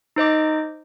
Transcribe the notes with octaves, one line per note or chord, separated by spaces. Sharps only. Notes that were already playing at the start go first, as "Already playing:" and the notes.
D#4 C5 D#5 D6